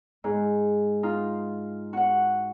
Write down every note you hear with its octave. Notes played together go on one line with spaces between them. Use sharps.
G#2
D#4 F4
F#4 F#5